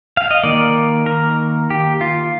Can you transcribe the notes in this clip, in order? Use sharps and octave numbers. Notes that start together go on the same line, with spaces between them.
F5
D#5
D#3 A#3 D5
A#4
G4
F4